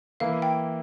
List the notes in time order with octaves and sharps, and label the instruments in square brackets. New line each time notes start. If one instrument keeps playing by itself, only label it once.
[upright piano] E3 A#3 E4 [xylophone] F5
[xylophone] G5